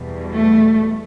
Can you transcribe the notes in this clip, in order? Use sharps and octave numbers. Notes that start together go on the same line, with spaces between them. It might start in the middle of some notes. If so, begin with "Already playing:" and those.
Already playing: E2 B2 G3
A3